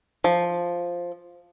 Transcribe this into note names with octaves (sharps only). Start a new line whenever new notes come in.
F3